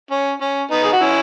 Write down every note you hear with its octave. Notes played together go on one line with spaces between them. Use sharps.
C#4
C#4
B3 D#4
G#4
F#4
C#4 E4